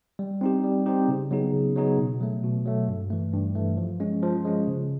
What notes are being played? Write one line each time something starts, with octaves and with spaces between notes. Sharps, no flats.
G3
C4 D#4 G4
G3
C4 D#4 G4
C#3
F#3 B3 D#4 G#4
C#3
F#3 B3 D#4 G#4
B2
F#3 A3
B2
F#3 A3
G2
E3 A3
G2
E3 A3
F3
G#3 C#4
F3
G#3 C#4
C#3